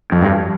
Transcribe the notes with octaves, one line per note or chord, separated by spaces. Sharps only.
F2
G2